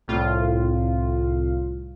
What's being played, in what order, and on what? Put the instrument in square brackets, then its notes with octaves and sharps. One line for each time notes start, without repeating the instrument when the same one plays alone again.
[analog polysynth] C2 A2 F4